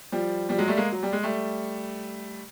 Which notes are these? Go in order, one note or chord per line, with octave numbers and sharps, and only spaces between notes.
F3 G3
F3 G3
F#3 G#3
G3 A3
G#3 A#3
F#3
G3
G#3
G3 A3